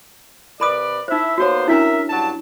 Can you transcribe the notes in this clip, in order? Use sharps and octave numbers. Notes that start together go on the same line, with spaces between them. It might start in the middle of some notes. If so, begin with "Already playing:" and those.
C3 A#4 B4 D5 B5 D#6
D#4 E4 C5 E5
A#3 B3 F#4 G4 C5 C#5
C#4 D4 E4 A#4 E5
G2 F#3 A5